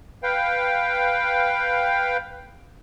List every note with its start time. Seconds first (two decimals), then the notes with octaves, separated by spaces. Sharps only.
0.23 B4 F5 G5